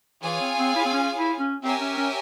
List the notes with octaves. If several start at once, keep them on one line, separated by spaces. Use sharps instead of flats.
E3 F4 G#4 C#5 F5 G#5
C4
C4
E4
C4
C#4
E4
C#4
C4 G4 A#4 C#5 E5 G#5
C#4
C#4